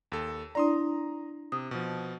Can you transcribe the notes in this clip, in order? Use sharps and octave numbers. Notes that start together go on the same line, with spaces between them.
D#2 A4
D4 E4 D5 A#5 C6 D#6
C3 D#6
B2 F3